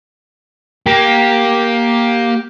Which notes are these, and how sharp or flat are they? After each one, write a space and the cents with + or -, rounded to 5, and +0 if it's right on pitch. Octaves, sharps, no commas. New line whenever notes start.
A#3 +10 G4 +0